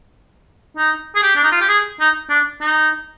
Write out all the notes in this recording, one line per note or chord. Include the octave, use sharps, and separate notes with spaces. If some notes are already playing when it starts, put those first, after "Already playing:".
D#4
G#4
G4
D4
D#4
F4
G4
G#4
D#4
D4
D#4